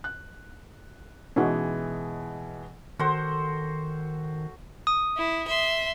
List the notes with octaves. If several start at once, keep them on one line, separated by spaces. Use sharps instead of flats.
F#6
B2 E3 G#3 C#4 D#4 F#4
D#3 F#4 A4 C5
D#6
E4
E5 C6